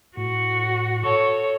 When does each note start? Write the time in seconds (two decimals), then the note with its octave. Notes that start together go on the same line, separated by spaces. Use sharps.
0.17 A2 F#4
1.04 A4 C#5 C#6